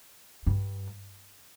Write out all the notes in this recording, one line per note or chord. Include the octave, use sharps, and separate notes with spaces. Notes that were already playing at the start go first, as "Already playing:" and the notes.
G2